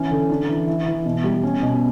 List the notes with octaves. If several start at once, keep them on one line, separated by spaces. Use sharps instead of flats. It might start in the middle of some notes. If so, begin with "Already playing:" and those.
Already playing: E3 C#4
D3
D4
E3
E4
E3
B2
G3
C#4
B2